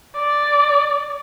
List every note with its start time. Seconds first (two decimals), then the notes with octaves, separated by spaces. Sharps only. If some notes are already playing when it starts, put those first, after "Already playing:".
0.16 D5